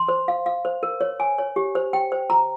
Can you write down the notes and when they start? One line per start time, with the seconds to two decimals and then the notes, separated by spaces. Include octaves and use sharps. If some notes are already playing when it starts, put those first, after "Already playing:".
Already playing: C6
0.08 C5
0.28 F5
0.46 F5
0.65 C5
0.83 A#4
1.01 C#5
1.20 G#5
1.38 C#5
1.56 G4
1.75 C5
1.93 G5
2.12 C5
2.30 A#5